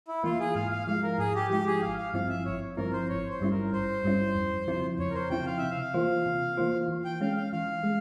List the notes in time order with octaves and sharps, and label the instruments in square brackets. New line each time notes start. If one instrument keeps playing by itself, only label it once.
[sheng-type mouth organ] E4
[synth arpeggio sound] E3 A#3 E4 [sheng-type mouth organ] F4
[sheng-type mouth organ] G#4
[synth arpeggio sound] G#2 [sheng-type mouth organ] F5
[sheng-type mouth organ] F5
[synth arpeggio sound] F3 G#3 E4 [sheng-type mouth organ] F5
[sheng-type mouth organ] A#4
[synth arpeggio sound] G#2 [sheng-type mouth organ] G#4
[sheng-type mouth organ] G4
[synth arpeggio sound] F3 G#3 E4 [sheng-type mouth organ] G4
[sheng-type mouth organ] G#4
[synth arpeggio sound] G#1 [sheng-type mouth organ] F5
[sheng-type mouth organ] F5
[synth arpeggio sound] G2 F3 C4 E4 [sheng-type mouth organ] F5
[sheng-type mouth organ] E5
[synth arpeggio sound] G#1 [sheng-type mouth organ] C#5
[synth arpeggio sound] G2 F3 C4 E4 [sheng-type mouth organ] A#4
[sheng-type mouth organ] C5
[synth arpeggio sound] G#1 [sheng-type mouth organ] C#5
[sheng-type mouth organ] C5
[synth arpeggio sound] G2 G3 C#4 E4
[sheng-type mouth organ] A#4
[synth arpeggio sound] G#1 [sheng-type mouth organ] C5
[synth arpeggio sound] G2 G3 C#4 E4
F2
C#3 F3 C4 E4
[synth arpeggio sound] F2 [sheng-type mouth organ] C#5
[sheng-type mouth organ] A#4
C5
[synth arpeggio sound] C#3 F3 C4 E4 [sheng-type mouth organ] G5
[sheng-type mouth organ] F5
[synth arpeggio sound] C3 [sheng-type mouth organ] E5
[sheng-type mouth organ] F5
[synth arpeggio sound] E3 A#3 F4 C5
C3
E3 A#3 F4 C5
E3
[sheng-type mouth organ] G5
[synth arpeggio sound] G#3 C#4 [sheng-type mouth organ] F5
[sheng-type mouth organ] F5
[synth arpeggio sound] E3 [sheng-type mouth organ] F5
[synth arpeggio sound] G#3